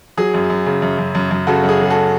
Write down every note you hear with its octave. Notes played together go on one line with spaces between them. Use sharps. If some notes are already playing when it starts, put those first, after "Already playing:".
F#3 G#4
F#2
F#2
C#3
F#2
F#2
F#2
F#2
C#3 F#4 A4
F#2
G#4
F#3 G#4
F#4 A4